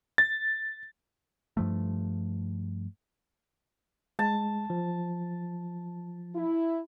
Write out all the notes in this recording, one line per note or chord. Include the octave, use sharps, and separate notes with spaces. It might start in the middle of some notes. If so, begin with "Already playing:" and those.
A6
G2 F3 A3
G#3 A5
F3
E4